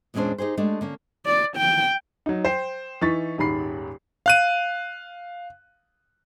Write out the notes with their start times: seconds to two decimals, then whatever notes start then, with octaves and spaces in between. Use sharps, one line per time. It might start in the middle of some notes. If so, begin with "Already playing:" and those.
0.14 E2 A#2 G#3 C#4 D4 C5
0.38 D#4 G4 G#4 C5
0.57 G#3 A3 D4 G4
0.81 D3 A#3 C#4
1.26 D5
1.57 G5
2.26 F#3 D#4
2.45 C5 G5 C7
3.01 E3 D#4 C#6 A6 B6
3.38 D#1 G#2 D#3 B5 C7
4.26 F5 F#6 D#7